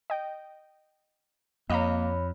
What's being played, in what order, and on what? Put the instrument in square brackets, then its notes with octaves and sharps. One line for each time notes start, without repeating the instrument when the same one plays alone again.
[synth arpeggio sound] D#5 G5
[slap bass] F2 [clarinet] A#3 [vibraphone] C#5 B5 [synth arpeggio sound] D#5 F5 A#5